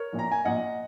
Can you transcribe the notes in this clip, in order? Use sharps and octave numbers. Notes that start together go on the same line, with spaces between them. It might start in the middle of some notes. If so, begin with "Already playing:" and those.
Already playing: A#4 C#5
A#1 A#2
A#5
G#5
A#1 A#2 D#5 F#5